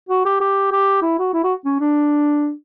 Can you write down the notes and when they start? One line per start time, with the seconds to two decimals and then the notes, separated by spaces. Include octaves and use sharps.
0.09 F#4
0.25 G4
0.40 G4
0.72 G4
1.02 E4
1.19 F#4
1.34 E4
1.44 F#4
1.65 C#4
1.80 D4